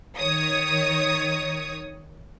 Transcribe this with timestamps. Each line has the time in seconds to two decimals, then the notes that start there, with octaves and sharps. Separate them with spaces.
0.17 D#3 C#5 D#6